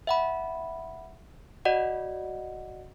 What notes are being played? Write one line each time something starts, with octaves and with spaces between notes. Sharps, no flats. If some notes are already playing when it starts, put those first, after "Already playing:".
E5 F#5 B5
F#4 D5 D#5 F#5